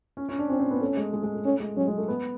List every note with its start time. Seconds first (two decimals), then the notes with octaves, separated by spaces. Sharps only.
0.17 C#4
0.29 C#4
0.39 D4
0.49 C4 C#4
0.60 C4
0.71 B3
0.80 A3 C#4
0.97 G#3
1.13 G#3
1.23 G#3
1.34 A3
1.44 A3 C#4
1.60 G#3
1.76 F#3 C#4
1.88 G#3
1.98 A3
2.08 B3